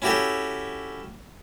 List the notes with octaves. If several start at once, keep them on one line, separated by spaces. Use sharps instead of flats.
C#4 E4 F#4 G4 A4 C#5